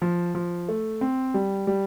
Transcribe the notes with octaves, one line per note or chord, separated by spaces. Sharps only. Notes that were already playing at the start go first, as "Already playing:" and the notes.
F3
F3
A3
C4
G3
G3